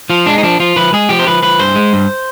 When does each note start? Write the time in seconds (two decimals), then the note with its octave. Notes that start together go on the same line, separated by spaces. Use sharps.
0.10 F3 F4
0.26 G#3 D4
0.38 D#4
0.43 F3 D4
0.60 F3 F4
0.76 F3 B4
0.93 G#3 G#4
1.09 F3 G4
1.19 C5
1.27 F3 B4
1.43 F3 B4
1.59 G2 C5
1.76 G#3
1.93 G2